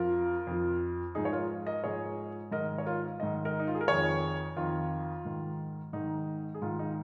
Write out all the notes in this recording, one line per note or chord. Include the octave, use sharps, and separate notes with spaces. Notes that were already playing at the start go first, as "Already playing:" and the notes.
Already playing: F2 F3 F4 A#4
F2 F3
G#2 F3 D#4 G#4
C#5
F4 A#4
A#4 D#5
G#2 F3 G#4 C#5
G#2 D#3 A#4 D#5
C#5
F4 A#4
G#2 D#3 D#5
A#4 D#5
D#4
F4
G#4
A#4
F2 D#3 G#4 C#5
F2 D#3 F4
G#2 D#3
G#2 D#3 D#4
G#4
G#2 D#3 F4
D#4